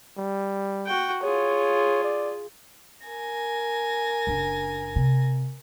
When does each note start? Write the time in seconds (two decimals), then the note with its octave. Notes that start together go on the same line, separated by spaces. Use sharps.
0.17 G3
0.87 F#4 G5
1.23 F4 G#4 C#5
2.04 D5
3.06 A#4 G#5 A#6
4.27 F#1 D4
4.96 C3